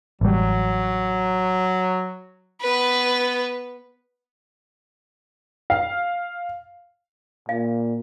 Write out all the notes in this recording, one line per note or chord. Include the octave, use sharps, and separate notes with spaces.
A1 F#3 G3
B3 B4
F5
A#2 F5